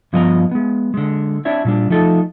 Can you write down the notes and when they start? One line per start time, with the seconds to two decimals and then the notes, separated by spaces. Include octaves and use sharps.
0.13 G2 F3 B3 D#5 G#5 A#5
0.51 G#3 B3
0.94 D3 G#3
1.45 C4 D4 E4 C#5 E5
1.65 A#2 G3 D4
1.90 F3 A3 D#4 A4 D#5